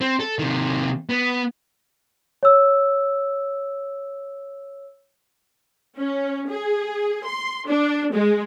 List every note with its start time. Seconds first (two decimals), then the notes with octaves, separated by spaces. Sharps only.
0.01 C4
0.20 A4
0.39 C3 D#3
1.09 B3
2.43 C#5 E6
5.99 C#4
6.50 G#4
7.25 C6
7.68 D4
8.13 G#3